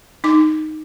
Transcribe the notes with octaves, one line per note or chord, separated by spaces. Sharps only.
D#4 D6